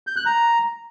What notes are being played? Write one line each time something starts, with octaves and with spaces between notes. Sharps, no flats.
G6
F#6
A#5